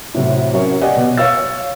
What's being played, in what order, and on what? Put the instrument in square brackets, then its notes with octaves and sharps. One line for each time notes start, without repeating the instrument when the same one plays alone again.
[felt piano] A2 C3 F#3
F#3 C#4 A#4 C#5
G4 D5 D#5 F#5 G#5
B2
C#5 F5 E6 A6